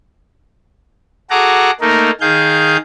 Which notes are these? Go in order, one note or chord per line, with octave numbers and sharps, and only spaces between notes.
F#4 G#4 A4 F#5 A#5 D6
A3 A#3 D#4 A#4
D#3 G#4 F5 G6